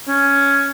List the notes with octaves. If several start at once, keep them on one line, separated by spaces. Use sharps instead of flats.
C#4